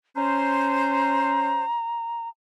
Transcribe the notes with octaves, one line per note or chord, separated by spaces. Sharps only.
C#4 C5 A#5